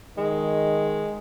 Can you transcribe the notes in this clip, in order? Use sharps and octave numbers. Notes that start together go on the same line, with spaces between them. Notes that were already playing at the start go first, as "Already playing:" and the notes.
D#3 G#3